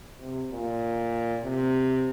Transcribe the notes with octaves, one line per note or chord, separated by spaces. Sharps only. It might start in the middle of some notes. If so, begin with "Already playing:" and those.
C3
A#2
C3